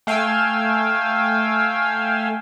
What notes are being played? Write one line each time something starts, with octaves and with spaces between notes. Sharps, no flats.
A3 F5 G5 G#5 E6